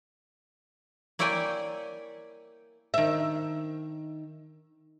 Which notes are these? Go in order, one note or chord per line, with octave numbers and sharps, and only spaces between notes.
A#3 E4 C#5 D5 G5 G#5
D#3 E5